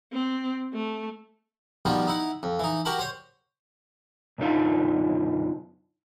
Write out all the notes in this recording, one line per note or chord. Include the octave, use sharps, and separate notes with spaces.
C4
A3
B2 D#3 F3 G3 B3
D#4 E4 F#5
F2
E3 D#4
F#4 G4 A#4 F#5 A5 B5
C5 C#5
B1 F#2 D3 D#4 F4 F5